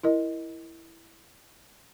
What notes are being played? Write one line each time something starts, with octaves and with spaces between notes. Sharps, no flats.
E4 A#4 D#5